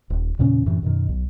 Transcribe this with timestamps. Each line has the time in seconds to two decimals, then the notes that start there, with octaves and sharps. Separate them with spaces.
0.10 D#1
0.39 E2 A#2 C#3 C#4
0.66 F#2 A2 C3 E3
0.83 F#2 B2 D#3
1.08 B1